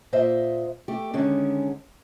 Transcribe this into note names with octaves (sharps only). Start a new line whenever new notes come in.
A#2 C5 D#5 E5
A3 G4
D3 D#3 G#3 C#4